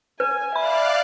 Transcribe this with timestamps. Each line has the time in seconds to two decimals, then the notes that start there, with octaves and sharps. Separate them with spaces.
0.20 B4 G#5
0.56 D5 E5 F5 B5 F#6